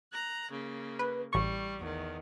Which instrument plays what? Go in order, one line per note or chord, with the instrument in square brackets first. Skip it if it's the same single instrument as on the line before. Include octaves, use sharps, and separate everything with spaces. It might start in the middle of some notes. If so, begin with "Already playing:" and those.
[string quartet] A#5 F#6
C#3 A#3
[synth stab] B4
[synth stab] A1 C#6 [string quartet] G3
[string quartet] E2 D#3